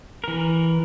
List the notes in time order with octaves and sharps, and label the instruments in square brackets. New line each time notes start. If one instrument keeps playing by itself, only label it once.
[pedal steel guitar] E3 A#4